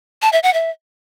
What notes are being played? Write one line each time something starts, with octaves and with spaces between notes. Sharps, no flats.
A5
E5
F#5
E5